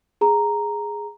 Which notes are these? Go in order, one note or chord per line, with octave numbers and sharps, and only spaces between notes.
G#4 A#5